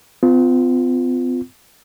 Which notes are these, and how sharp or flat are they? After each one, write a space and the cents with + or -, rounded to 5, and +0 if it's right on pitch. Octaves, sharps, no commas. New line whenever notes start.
C4 -45 F4 +0